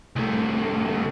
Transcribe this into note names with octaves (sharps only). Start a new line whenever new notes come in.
C2 A3